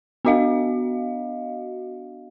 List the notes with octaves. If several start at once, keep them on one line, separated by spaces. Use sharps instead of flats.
B3 D4 F#4 D#5 F5